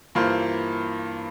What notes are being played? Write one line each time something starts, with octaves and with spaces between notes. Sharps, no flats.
G2 E3 A#3 F4 C5